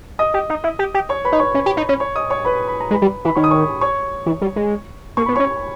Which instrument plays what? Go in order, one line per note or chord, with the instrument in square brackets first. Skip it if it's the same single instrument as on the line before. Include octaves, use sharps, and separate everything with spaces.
[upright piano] D#5 D#6
[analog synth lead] G4
D#4
E4
G4
G4
[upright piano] C#5 C#6
B4 B5
[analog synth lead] D#4
[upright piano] C#5 C#6
[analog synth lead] C#4
G4
D#4
C#4
[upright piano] C#5 C#6
D#5 D#6
C#5 C#6
B4 B5
B5
A#5
[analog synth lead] G#3
[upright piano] B4 B5
[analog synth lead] G3
E3
[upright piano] B5
[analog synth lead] D#3 [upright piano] C#5 C#6
[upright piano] D#6
C#5 C#6
C#5 C#6
[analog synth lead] E3
G3
G#3
[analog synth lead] A#3 [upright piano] C#6
[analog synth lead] B3 [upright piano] B5
[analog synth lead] C#4 [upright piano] C#5 C#6